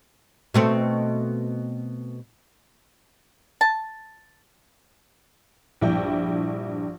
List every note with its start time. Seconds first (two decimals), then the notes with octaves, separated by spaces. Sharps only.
0.54 B2 A3 C4
3.61 A5
5.81 A#1 G2 E4 G4 G5